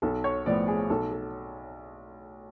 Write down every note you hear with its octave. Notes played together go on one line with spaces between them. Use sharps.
B1 A4
C#5
A2 F3 B3 D5
G#4
B1 A4
A4